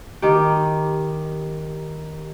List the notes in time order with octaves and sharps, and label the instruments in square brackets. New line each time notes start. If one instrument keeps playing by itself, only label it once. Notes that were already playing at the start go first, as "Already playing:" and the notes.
[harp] D#3 G4